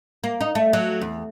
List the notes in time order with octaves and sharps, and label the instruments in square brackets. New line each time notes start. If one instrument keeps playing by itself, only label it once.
[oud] A#3
D#4
A3
F#3
E2